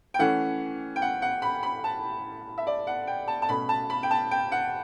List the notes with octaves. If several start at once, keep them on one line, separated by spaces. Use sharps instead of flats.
G5
E3 A3 C#4 F#5
G5
F#5
F#5
B5
B5
A5
E5
D5
F#5
G5
A5
A5
B2 A3 C#4 B5
A5
B5
G5
A5
G5
F#5